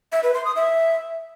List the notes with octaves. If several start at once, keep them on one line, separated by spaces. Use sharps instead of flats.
E5
B4
C6
D#6
E5